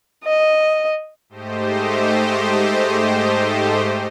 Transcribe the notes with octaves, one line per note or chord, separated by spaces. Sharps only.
D#5
G#2 A3 G4 C5 D#5